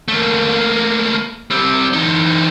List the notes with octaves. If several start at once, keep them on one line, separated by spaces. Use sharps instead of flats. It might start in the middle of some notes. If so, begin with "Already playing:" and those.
A3 A#3
G3 C4
E3 D#4